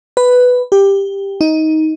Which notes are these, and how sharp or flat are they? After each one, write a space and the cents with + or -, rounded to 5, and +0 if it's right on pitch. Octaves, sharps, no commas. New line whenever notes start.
B4 +5
G4 +10
D#4 +15